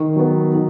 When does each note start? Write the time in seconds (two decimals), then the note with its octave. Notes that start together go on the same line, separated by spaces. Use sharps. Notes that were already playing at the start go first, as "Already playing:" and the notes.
Already playing: D#3
0.16 F#3 B3
0.55 D#3